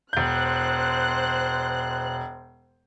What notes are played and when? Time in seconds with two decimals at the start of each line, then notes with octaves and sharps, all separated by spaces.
0.13 E1 C5 F#6 G6